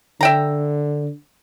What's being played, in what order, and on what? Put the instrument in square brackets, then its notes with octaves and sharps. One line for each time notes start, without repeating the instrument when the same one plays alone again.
[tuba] D3 [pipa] E5 G5 A#5